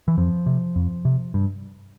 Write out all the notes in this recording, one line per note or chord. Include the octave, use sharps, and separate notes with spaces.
E3
F2 F3
C3
F2
C3
G2